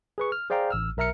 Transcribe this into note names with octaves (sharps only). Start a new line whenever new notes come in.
G#4 B4 C#6
F6
G#4 C5 D5 F5 G5 A#5
A1 E6 F6
B1 A#4 E5 A#5 F6 C#7